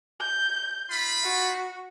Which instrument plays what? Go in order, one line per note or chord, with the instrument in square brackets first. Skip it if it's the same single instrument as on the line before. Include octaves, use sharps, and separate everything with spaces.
[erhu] G6
[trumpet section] D#4 F4 B5
[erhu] F#4